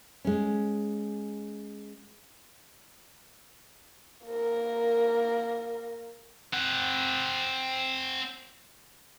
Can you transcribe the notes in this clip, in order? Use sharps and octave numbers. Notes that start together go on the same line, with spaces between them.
G#3 C#4
A#3 A#4
C4 F#5